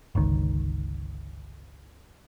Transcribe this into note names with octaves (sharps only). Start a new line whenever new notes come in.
G1 C#2 D#3